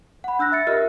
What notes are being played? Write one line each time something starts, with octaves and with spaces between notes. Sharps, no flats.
F#5 B5
D4 E6 F#6 A#6
E5 A6 C#7
F4 G4 A#4 D#5 E5 F6